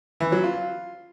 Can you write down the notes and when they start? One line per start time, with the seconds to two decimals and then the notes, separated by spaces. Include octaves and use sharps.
0.20 E3
0.32 F#3
0.44 F4